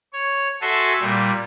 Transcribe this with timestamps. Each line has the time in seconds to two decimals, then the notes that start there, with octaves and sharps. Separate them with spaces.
0.13 C#5
0.61 F#4 A4 E5 G#5 A5 C6
1.00 A#2 G3